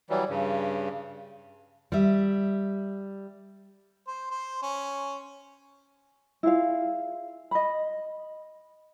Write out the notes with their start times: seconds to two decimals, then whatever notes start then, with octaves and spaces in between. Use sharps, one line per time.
0.10 E3 F#3 G3
0.29 G2 C#3
1.92 G3 E5
4.07 C5
4.31 C5
4.62 C#4
6.43 E4 F4 G#4 F5
7.51 D#5 B5